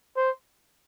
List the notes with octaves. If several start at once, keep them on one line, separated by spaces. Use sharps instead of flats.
C5